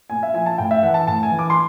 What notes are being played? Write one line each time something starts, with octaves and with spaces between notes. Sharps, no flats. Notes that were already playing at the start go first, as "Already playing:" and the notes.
A#2 G#5
E5
F3 G#5
A5
A2 G5
E5
E3 F#5
A5
A2 A5
G#5
E3
D6
C6